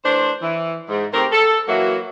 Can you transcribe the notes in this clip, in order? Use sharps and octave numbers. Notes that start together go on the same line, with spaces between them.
E3 A3 D4 C5
E3
G#2
D#3 A3 C4 G4 A#4 C5
A4
E3 F#3 A#3 E4 F#4